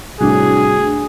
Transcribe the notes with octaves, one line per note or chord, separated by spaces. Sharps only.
C2 A2 D4 F#4 G#4